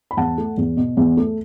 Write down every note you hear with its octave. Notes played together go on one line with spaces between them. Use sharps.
B5
E2 F#5 A5
A3
E2
B2
E2
A3